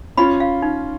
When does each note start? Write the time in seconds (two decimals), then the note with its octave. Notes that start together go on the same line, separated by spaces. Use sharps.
0.17 C#4 F4 B5
0.40 F5
0.62 D#4